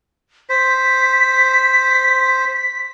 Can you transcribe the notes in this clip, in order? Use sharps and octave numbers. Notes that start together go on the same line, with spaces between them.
C5 B6